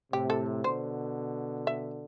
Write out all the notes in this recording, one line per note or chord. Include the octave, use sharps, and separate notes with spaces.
A2 C3 G4
A4
B2 D3 C5
E5